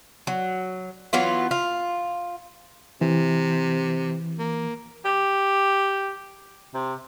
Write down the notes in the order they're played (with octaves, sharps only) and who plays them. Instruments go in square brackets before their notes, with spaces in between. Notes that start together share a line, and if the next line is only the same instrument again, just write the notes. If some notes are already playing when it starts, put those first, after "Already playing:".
[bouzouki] F#3
E3 F#3 B3 F4
F4
[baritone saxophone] C3 [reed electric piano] E3
[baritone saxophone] A#3
G4
C3